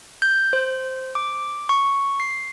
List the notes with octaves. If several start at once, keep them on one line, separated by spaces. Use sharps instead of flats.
G6
C5
D6
C#6
C7